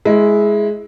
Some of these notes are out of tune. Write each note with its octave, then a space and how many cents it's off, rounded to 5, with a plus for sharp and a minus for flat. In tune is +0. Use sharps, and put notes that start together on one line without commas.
G#3 +10 E4 -5